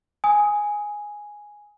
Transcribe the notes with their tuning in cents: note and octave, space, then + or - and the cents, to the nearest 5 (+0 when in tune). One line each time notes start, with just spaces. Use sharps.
G#5 +0 D#6 +15